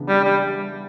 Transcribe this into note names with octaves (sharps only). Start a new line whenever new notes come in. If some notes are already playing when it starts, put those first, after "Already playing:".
Already playing: C#3 E3 B3 D4
G3
G3